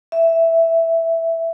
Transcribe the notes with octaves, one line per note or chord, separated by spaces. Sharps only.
E5